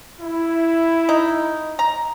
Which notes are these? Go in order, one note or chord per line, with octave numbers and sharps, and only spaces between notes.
E4
D#4
A#5